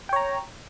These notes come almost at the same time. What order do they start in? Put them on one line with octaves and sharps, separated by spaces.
G5 C#5 A#5